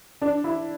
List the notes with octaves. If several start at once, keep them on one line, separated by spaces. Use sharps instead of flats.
D4
E4